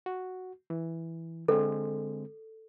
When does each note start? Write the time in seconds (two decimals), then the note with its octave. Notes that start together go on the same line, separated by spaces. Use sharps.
0.06 F#4
0.70 E3
1.48 D3 G#3 C4 A4